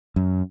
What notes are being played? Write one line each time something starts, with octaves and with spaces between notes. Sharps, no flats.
F#2